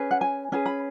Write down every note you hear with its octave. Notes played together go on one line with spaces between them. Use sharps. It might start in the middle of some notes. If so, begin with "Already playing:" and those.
Already playing: C#4 G#4 B4
F#5
G#5
C#4 G#4 B4 G#5
B5